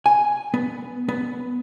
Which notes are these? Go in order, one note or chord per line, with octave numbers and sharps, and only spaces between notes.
G#5
B3
B3